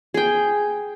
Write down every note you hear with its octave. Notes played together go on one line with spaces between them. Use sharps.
G#4 G5